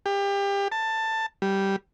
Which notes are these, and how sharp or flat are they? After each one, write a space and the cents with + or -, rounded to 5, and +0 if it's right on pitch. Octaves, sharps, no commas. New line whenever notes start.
G4 +30
A5 +15
G3 -5